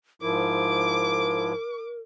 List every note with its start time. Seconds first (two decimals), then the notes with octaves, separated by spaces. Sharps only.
0.22 G#2 F3 E4 A#4 D6